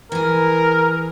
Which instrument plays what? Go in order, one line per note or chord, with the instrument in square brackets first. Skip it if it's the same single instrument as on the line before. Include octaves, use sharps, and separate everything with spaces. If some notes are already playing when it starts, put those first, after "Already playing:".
[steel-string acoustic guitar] E3 G#4 [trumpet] A#4